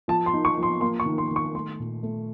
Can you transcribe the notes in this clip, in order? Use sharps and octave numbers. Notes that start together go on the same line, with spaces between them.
F3 A5
C6
D#4
C#6
F3
C6
A#3 C6
C#6
D#3
C6
D#3
C#6
A3 C6
A#2
A3